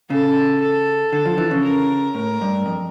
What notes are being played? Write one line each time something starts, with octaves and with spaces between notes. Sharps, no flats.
C#3 A4
A4
D3 A4
F3
E3
C#3
A#4
A2 A#4
G2
F2